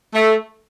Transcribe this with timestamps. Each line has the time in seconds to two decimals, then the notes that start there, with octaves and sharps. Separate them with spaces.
0.14 A3